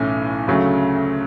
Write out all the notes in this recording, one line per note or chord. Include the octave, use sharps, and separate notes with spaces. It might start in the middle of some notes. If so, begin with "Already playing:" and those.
Already playing: B1 A2 E3 A3 C#4
D2 C#3 F#3 A3